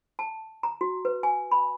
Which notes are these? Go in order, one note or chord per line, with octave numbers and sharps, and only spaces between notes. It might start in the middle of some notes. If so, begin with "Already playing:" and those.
A5
A#5
F#4
B4
G#5
B5